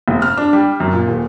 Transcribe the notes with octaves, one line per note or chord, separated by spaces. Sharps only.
F1
F6
D4
G3
F#2
A#2
D#1